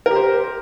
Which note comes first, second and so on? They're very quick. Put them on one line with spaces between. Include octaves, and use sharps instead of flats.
A#4 G4 C5